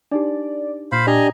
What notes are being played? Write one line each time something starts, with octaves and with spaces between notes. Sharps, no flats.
D4 D#4 G4 D5
A#2 C5 F5 B5
D4 G4 D#5 G#5 A#5